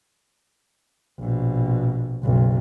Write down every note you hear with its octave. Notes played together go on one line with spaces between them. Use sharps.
A#1 B2
F#1 B1